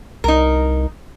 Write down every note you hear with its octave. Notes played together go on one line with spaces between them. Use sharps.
C2 D#4 A#4